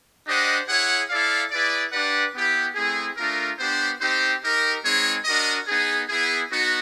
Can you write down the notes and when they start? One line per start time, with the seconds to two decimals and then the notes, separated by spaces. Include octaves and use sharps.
0.26 D4 G4 C5 D#5 F#5
0.68 E4 G#4 C#5 F#5
1.09 E4 A4 D5 F5
1.51 E4 G#4 B4 D5
1.92 D4 G4 B4 D5 F#5
2.34 B3 E4 G4
2.75 A3 C4 E4 G#4
3.17 A3 D4 F4 A#4
3.59 B3 D4 G4 C5
4.00 C4 D#4 G4 C5
4.42 D#4 G4 A#4
4.84 G#3 C4 D#4 G#4 C#5
5.25 D4 F#4 A#4 D#5
5.67 B3 D#4 G#4
6.09 B3 E4 G#4
6.51 B3 D#4 F#4